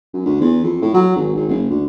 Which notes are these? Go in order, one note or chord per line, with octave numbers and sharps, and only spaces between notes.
F#2
D2
E2
F2
A2
F#3
G#1
G#1
F#1
D2